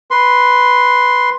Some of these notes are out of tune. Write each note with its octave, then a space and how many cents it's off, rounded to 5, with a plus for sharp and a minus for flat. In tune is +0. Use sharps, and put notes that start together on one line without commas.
B4 +0 C6 +0